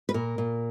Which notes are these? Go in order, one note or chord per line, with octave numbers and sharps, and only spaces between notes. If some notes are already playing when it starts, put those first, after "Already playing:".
B4
A#2 A#4
A#2